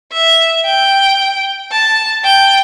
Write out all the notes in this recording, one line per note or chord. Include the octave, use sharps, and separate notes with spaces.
E5
G5
A5
G5